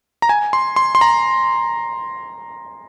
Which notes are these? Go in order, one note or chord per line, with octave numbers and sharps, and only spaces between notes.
A#5
G#5
C6
C6
C6
A#5